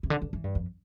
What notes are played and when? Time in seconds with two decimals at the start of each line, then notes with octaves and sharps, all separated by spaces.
0.03 C3
0.10 D3
0.22 D3
0.33 E3
0.44 G2
0.55 F2